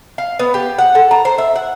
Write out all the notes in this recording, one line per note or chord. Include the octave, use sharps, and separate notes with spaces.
F5
B3
G4
F#5
A4
A#5
C5
E5
F#5